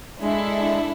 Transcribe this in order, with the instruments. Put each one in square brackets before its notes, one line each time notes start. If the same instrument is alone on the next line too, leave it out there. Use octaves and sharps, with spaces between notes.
[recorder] G#3 [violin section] D4 E4 A4